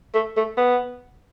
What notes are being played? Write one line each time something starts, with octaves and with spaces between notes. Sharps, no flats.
A3
A3
B3